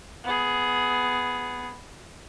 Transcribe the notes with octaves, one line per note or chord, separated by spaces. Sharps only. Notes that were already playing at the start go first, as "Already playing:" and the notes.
B3 G#4